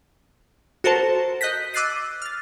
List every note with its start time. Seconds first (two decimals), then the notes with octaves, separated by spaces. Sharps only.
0.84 F#4 A4 A#4 C5 A5
1.41 D#5 F#6 G6 A#6 B6
1.74 D6 E6 F#6 A6 C7 D#7
2.22 F6 A6